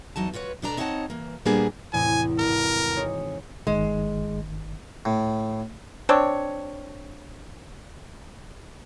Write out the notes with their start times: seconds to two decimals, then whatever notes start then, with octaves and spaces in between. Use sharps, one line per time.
0.16 E2 F#3 D#4 A5
0.34 F4 F#4 B4 C#5
0.62 B2 B3 D4 A4 D5 A#5
0.77 C4 D#4 C#5 D5 F#5 A5
1.10 E3 A#3
1.45 A#2 G3 A#3 B3 D4 G#4
1.93 E2 A2 C3 G#5
2.39 G#1 A4 A#4
2.96 D#4 G#4 C#5
3.67 G1 D#3 G#3
5.05 A2
6.09 C4 D4 C#5